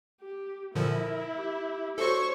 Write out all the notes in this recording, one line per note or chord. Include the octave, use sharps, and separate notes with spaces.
G4
A#2 D3 F3 E4 A#4
G4
D4 F#4 A4 C5 C#5 C#6